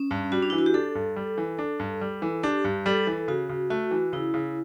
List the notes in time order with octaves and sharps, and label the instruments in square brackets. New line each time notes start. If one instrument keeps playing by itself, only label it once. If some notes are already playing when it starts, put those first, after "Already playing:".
Already playing: [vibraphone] C#4
[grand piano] G2
[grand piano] G3 [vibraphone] F#4
[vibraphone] D4
[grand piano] E3 [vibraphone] E4
[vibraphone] F#4
G4
[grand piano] D4 [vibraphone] A4
[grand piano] G2
G3
E3
D4
G2
G3
E3
[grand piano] D4 [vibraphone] G4
[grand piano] G2
[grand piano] G3 [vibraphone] A4
[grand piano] E3
[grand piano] C#3 [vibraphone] F#4
[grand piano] C#3
[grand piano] A3 [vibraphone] F#4
[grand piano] E3
[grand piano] C#3 [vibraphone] E4
[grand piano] C#3